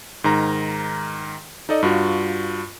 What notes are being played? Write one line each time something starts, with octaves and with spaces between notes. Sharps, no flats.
G#2 D#3 A#5
D#4 A4 D5 D#5
G2 F4 F#4